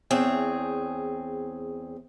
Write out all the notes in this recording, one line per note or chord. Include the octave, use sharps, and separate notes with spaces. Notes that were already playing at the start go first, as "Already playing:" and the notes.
E2 C4 G#4 C#5